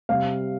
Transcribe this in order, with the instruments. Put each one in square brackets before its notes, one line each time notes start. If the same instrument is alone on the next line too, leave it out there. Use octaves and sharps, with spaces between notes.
[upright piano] C3 G3 F5